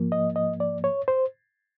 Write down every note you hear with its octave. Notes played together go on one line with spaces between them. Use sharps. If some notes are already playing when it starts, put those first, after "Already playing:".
Already playing: G#2 F3 A#3
D#5
D#5
D5
C#5
C5